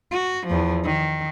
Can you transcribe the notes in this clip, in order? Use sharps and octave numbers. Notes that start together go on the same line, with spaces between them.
F#4
E2 F3
D#3